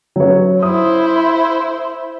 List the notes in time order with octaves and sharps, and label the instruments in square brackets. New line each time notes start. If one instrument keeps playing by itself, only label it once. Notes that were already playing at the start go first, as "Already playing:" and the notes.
[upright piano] F#3 C#4 C#5
[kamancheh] E4 C5 [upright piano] D#6